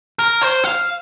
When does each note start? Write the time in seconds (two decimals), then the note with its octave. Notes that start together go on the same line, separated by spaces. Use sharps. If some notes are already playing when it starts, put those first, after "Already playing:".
0.20 A#4
0.43 C5
0.64 F5